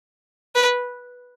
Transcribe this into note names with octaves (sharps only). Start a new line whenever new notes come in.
B4